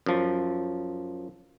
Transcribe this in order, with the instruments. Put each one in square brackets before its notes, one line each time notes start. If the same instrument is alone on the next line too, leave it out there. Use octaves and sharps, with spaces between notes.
[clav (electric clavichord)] F#2 F3